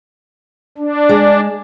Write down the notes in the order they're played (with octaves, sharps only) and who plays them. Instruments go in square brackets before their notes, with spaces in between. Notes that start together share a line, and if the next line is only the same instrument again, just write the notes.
[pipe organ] D4
[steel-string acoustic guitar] G#3